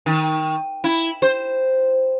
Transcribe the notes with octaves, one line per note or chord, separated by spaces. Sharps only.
D#3
E4
C5